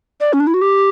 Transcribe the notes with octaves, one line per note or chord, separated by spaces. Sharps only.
D5
C#4
D4
E4
F#4
G4